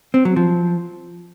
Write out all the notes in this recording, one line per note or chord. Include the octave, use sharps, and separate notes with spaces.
C4
F#3
F3